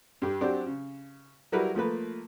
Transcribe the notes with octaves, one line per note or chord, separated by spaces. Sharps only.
G2 G4
F#3 C4 D4 G4
C#3
F#3 G3 E4 A#4 B4
F3 A3 A#3 B4